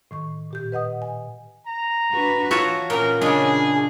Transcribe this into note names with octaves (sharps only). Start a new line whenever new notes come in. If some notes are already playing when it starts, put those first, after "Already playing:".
A2 D#3 C#6
A#2 G4 G6
B4 D#5 F#5 D#6
G#5
A#5
D4 F#4 B4
E3 F4 F#4 C#5 E5 A5 A#5
A#2 C#4 A#4
C#3 G#3 D4 G#4